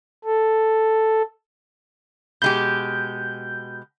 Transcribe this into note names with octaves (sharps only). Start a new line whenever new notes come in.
A4
B2 G#3 G4 G6